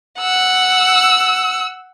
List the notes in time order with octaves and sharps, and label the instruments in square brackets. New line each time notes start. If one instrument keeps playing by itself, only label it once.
[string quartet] F#5 E6